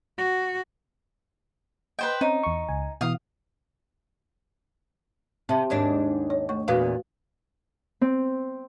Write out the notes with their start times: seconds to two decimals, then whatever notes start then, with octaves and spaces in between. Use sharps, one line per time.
0.18 F#4
1.99 B4 C5 D#5 G5
2.21 C4 C#4 D#4 C#5
2.43 E2 C#6
2.69 C#2 G#5
3.01 B2 E3 F5 D#6
5.49 C3 C4 E5 A5
5.70 D#2 G#2 D4
6.30 C#5
6.49 A3 C#6
6.68 E2 A#2 B3 F#4 B4 F5
8.01 C4